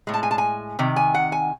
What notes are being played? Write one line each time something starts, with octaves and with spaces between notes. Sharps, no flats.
A2 G#3
A5
G#5
A5
G#5
C3 D#3
G#5
F#5
G#5